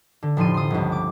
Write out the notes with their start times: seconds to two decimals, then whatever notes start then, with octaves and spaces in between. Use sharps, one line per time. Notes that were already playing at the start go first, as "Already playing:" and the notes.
0.22 D3
0.37 F1 A2 F3 C6 D#7
0.54 C6 D#6
0.70 G1 C#2
0.92 D6